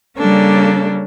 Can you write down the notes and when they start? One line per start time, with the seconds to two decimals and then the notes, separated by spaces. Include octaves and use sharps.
0.18 C#3 G3 A#3 C#4 D4 A4